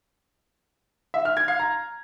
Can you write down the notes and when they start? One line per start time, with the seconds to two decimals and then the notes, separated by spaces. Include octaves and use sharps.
1.14 E5
1.25 F6
1.37 G#6
1.48 F5
1.59 A#5